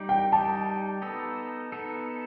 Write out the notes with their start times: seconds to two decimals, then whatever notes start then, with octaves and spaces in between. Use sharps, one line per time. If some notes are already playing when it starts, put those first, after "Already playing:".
Already playing: G3 D#4 G4
0.09 G5
0.32 G3 D#4 G4 A5
1.02 B3 D#4 A4
1.72 B3 D#4 A4